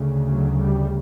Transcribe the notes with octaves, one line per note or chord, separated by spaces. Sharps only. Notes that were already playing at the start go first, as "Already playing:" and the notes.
Already playing: D2 C#3
F#3
G3